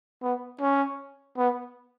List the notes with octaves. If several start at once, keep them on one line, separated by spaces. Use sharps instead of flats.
B3
C#4
B3